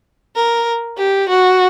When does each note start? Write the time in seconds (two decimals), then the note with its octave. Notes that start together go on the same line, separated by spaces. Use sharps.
0.36 A#4
0.98 G4
1.29 F#4